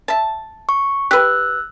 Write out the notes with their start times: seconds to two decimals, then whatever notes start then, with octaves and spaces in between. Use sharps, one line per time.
0.08 E5 A5
0.69 C#6
1.11 G4 B4 E6 F#6